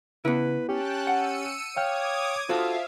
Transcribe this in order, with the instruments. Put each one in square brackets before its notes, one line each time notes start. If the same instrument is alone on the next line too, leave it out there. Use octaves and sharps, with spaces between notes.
[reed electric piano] C#3 [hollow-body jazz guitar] B3 E4 [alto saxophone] B4
[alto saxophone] C#4 [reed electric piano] G4 [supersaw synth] G5 A5 F#6
[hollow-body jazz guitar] F#5 [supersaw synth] E6 C#7 D#7
[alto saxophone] C#5 [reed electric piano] F5 G5 F6 [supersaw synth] D6 D#6 G#6
[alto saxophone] F4 [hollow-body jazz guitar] F#4 A4 [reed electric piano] C5 [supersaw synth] E5 F5